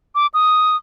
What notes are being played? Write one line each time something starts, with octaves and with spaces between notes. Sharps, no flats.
D6
D#6